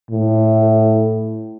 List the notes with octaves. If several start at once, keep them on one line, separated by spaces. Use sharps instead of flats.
A2